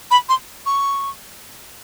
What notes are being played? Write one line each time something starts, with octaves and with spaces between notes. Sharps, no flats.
B5
C6
C#6